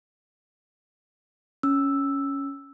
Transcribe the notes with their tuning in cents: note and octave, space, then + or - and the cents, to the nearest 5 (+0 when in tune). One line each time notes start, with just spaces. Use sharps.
C#4 +0 E6 +0